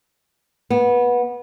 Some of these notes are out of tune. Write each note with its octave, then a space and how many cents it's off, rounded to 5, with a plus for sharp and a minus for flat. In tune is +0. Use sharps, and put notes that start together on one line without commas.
B3 -20